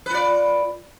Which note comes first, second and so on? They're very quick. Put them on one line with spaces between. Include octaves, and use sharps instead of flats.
B4 F4 D5